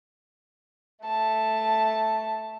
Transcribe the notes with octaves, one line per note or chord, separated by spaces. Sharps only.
A3 A5